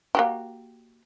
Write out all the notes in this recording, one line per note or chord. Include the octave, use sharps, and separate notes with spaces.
A#3 F#4 G4